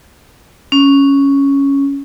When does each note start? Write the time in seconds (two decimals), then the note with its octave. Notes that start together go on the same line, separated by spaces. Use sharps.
0.72 C#4